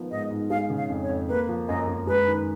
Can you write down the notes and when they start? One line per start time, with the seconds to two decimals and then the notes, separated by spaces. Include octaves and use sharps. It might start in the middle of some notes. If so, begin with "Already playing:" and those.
Already playing: D#3 F3 B3
0.11 G#2 D#5
0.31 G#2
0.50 G#3 F5
0.70 C#3
0.77 F5
0.90 F2
1.02 C#5
1.09 F2
1.28 A#3 B4
1.49 F3
1.68 F#2 D#5
1.88 F#2
2.07 G#3 B4
2.27 D#3